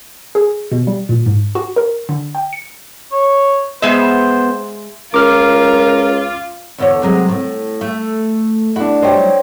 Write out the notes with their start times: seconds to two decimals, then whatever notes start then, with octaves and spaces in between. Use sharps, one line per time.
0.35 G#4
0.72 B2
0.87 G3
1.09 A#2
1.26 G#2
1.55 F#4
1.76 A#4
2.09 D3
2.35 G5
2.53 C#7
3.12 C#5
3.82 G#3 B3 C5 E5
5.14 C#2 F4 A#4 D6 F6
6.78 E2 D3 C#5
7.02 C3 F#3 G#3
7.29 A2
7.81 A3
8.76 D4 E4 F#4
9.02 F#3 G3 D#4 C5 C#5 G5